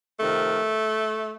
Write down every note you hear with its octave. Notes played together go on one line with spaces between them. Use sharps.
F2 C3 D#3 A3